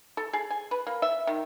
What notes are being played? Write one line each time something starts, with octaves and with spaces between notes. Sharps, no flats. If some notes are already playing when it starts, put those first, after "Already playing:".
A4
G#4
G#5
B4
A#3
E5
D#3